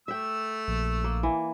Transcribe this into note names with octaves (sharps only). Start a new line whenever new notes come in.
A3 E5 G5 E6
A#1
A#3
E3